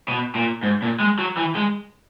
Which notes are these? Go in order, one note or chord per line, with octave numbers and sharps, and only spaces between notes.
B2
A#2
G#2
A#2
G#3
F#3
E3
G#3